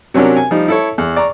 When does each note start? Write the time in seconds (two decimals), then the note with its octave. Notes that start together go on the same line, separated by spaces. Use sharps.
0.14 C3 F#3 C#4 D4 A#4
0.37 G#5
0.51 F3 G3 D#4
0.68 E4 A4 C#5
0.98 E2
1.16 D5 A#5 C#6